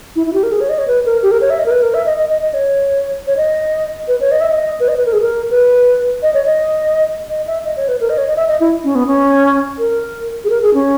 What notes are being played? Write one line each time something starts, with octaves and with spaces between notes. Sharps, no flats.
E4
E4
G4
A#4
G#4
C#5
D#5
C#5
B4
A#4
G4
A#4
C#5
E5
D#5
A#4
B4
A#4
E5
D#5
D#5
D#5
D#5
C#5
C#5
D#5
B4
C#5
D#5
E5
D#5
B4
D#5
B4
A#4
G#4
A#4
B4
D#5
C#5
D#5
D#5
E5
D#5
C#5
B4
A#4
D#5
C#5
D#5
E5
D#5
E4
C#4
B3
C#4
A#4
G#4
A#4
G#4
C#4